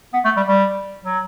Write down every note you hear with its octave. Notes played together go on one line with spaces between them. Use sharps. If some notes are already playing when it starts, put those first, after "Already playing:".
B3
A3
G3
G3
F#3